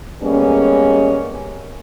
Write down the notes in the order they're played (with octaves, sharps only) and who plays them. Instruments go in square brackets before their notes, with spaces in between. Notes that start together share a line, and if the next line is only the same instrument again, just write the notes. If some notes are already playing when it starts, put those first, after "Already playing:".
[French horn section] G3 G#3 A#3 B3 C#4